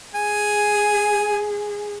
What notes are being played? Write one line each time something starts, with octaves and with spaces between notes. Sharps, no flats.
G#4 G#5